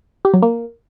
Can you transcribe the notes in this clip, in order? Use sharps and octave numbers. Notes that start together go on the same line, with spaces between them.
G4
F#3
A#3